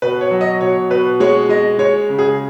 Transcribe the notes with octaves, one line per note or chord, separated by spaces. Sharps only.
B2 B4
C#5
F#3
D#5
B2 C#5
B2 B4
G#3 C#5
G#3 D#5
G#3 C#5
C#3
G#4